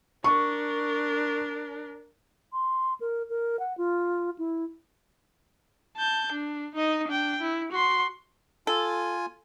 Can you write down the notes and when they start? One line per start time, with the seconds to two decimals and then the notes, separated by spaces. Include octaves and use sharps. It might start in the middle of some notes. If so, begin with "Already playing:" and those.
0.24 D4 A#4 C#6
2.52 C6
3.00 A#4
3.30 A#4
3.59 F#5
3.78 F4
4.39 E4
5.97 A5 G6
6.32 D4
6.75 D#4 D#5
7.07 D4 G5
7.41 E4
7.72 F#4 C6
8.67 F4 A4 G#5